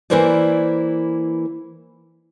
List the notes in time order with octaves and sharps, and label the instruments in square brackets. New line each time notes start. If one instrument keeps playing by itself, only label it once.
[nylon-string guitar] E3 A#3 E4 A#4 C5 D5